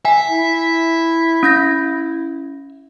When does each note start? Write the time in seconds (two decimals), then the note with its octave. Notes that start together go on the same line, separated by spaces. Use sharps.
0.05 E5 G#5
0.28 E4
1.43 C#4 G6 A#6